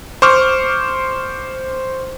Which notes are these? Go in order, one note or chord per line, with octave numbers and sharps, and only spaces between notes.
C5 C#6 D6 F6